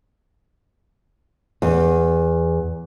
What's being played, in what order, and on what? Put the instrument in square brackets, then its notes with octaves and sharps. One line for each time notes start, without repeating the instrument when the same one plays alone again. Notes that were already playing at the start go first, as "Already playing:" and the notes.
[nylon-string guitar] E2